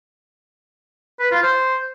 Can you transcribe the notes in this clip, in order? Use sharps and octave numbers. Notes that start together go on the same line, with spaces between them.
B4
F4
C5